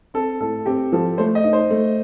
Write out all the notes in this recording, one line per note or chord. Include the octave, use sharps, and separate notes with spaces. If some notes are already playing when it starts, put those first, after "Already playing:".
C4 A4
A2 A4
C4 G4
F3 A4
A3 C5
D#5
D#4
C5
A3